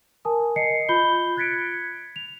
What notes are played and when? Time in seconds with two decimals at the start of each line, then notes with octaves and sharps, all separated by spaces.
0.25 A#4 G#5 A5 D#6
0.56 D#5 C7 C#7
0.89 F4 B5 G6 G7
1.37 F#6 G#6 A6 B6 C#7 D7
2.16 F7